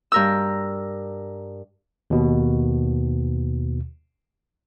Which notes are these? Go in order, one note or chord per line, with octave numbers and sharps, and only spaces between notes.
G2 A#4 E6
D#2 B2